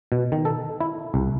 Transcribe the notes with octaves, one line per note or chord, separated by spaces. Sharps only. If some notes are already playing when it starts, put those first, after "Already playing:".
B2
D#3
A4
E4
C2